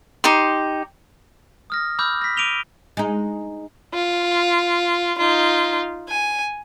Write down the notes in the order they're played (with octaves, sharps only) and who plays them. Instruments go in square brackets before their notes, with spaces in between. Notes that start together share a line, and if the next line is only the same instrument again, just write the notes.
[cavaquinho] D#4 G4 C6
[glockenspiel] D#6 F6 A#6
B5 D6 E6 F6 G6
A#6 B6
D6 D7 D#7 F7 G7
[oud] G#3 D#4
[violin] F4
D#4 F4
G#5